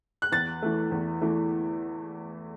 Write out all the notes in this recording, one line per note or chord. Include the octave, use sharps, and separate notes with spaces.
F#6
E2 A6
E3 A3
E2
E3 A3